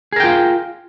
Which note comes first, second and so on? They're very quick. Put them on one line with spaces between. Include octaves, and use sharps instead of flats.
G#4 A#4 G5 F4